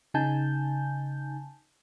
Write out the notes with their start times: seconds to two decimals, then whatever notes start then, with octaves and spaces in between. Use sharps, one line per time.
0.14 C#3 D#4 G#5 A5 G6